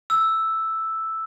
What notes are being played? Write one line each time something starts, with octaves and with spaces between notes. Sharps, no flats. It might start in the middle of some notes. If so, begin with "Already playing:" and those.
E6